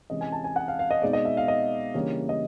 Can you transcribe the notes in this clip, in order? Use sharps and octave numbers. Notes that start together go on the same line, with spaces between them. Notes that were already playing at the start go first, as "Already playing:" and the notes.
C3 E3 G#3 C#4 D#5
G#5
A5
G#5
F#5
F5
F5
D#5
B2 G#3 C4 D#4 D5
D#5
E5
F5
D#5
C#3 E3 G3 A#3 D4 C#5
D#5